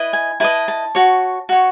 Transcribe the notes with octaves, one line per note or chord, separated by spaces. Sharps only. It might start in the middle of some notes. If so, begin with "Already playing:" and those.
Already playing: E4 B4 D#5
G#5
E4 B4 D#5 A5
A5
F#4 C#5
F#4 C#5